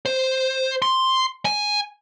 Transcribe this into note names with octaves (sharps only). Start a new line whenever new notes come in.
C5
C6
G#5